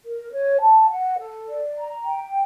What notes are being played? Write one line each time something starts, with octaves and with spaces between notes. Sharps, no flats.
A#4
C#5
A5
F#5
A4
D5
A#5
G5